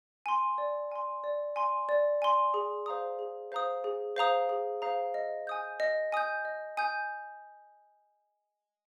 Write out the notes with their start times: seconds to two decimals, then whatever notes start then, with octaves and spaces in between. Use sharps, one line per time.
0.26 G#5 C6
0.58 D5
0.92 G#5 C6
1.24 D5
1.56 G#5 C6
1.89 D5
2.22 G#5 C6
2.54 G#4
2.86 C5 F5 A#5 D#6
3.19 G#4
3.52 C5 F5 A#5 D#6
3.84 G#4
4.16 C5 F5 A#5 D#6
4.49 G#4
4.82 C5 F5 A#5 D#6
5.14 D#5
5.47 G#5 D#6 G6
5.80 D#5
6.12 G#5 D#6 G6
6.45 D#5
6.77 G#5 D#6 G6